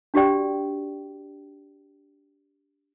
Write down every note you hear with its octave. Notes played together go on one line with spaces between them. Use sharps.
D4 F#4 G4 D5 G5